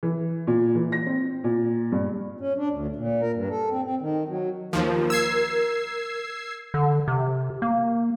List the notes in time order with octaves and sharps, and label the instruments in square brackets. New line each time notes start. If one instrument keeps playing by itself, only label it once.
[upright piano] E3
A#2
E3
A#6
C4
A#2
G2
[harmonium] C#4
D4
D2
A#2
A#4
G2
A4
C4
C4
D#3
F#3
[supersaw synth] D#2 F3 [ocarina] A#4
[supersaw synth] E6 G#6 C7
[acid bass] D3
C3
A#3